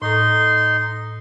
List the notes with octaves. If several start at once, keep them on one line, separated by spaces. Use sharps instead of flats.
A2 D#4 A4 C6